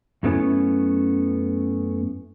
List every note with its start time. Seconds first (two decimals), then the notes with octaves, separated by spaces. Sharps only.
0.23 F#2 F#3 A3 B3 C#4 E4